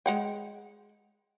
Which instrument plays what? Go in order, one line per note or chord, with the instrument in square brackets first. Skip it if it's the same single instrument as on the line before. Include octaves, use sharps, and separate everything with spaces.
[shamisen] G#3 F#5 G5